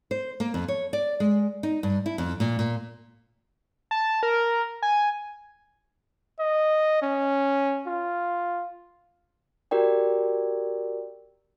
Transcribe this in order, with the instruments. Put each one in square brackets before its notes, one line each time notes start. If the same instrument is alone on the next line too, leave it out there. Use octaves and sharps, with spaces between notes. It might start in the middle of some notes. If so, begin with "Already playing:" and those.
[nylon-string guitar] C5
A#3
F2
C#5
D5
G#3
D#4
G2
E4
F2
A#2
A#2
[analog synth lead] A5
A#4
G#5
[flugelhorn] D#5
C#4
F4
[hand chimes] F#4 G4 A#4 D5 G5